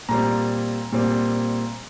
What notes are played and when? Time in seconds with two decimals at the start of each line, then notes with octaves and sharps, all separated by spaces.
0.09 A#2 G3 C4 A#5
0.92 A#2 G3 C4